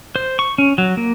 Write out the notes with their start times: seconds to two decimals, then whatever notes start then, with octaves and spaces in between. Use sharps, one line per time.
0.16 C5
0.39 C#6
0.58 C#4
0.78 F#3
0.97 A#3